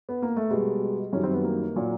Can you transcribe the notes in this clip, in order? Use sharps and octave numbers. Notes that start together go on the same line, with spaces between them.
B3
A#3
A3
B2 G3 G#3
F#2 D#3 G3 C#4
C4
B3
A#3
A#2 F#3